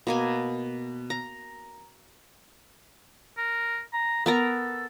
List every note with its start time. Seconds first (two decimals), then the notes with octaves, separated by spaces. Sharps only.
0.07 B2 A#3 G#5
1.10 A#5
3.37 A#4
3.93 A#5
4.26 B3 A4 A#4 A#5